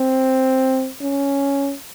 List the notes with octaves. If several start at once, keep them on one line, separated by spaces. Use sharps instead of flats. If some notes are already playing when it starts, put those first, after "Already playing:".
Already playing: C4
C#4